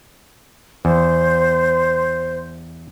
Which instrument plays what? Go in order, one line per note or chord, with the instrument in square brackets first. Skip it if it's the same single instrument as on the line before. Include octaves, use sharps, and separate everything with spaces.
[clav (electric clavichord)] E2 [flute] C5